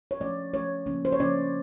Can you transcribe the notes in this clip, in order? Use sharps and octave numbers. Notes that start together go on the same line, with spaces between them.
C#5
F3 A3 C#4 D5
F3 A3 C#4 C#5
C#3 F3 A#3 C#4
C5
C#5
C#3 F3 A#3 C#4 D5